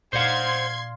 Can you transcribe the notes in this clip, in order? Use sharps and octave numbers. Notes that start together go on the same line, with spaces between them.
A#2 C5 D5 F5 F#5 C6 G#6